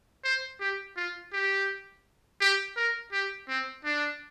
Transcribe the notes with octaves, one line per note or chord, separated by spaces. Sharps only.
C5
G4
F4
G4
G4
A#4
G4
C4
D4